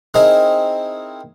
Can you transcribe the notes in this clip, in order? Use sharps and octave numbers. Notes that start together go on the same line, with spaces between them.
C4 D#4 E4 G#4 A#4